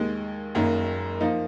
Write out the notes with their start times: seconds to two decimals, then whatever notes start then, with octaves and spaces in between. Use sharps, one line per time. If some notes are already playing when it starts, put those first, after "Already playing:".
Already playing: D#2 D#3 G#3
0.55 F#1 F#2 D#3 A#3
1.20 F3 A#3 D#4